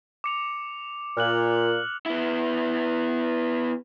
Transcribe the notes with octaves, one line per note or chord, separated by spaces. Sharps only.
D6 C#7 F7
A#2 F6 F#6 F#7
B3 E4